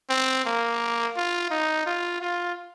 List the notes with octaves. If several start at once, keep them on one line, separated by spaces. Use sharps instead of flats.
C4
A#3
F4
D#4
F4
F4